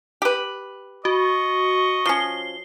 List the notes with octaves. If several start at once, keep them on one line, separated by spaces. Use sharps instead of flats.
G4 B4
F#4 D#5 C#6
F3 C#4 C7 G7